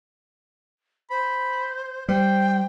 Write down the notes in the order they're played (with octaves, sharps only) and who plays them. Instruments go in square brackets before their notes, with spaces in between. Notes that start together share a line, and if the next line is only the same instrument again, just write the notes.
[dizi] C5 [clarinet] B5
[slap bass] G3 [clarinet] C5 [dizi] G5